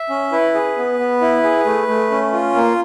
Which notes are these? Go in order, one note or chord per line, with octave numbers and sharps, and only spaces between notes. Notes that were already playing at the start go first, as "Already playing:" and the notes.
Already playing: E5
C#4
E4 B4
G#4
B3
B3
E4
G#4
A3
A3
C#4
F4
A#3